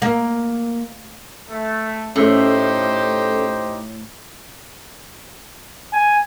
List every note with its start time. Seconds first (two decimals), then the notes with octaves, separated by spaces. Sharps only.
0.02 A#3
1.47 A3
2.16 A2 C#4 D#4 G4 A4 C5
5.93 G#5